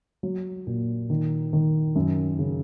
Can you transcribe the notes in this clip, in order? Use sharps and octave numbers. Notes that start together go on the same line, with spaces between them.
F#3
A#2
D#3
D#3
F#2
C#3